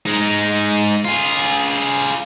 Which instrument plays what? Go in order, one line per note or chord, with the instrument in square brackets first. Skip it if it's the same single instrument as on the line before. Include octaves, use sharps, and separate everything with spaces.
[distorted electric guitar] G#3 D#4
F4 G#4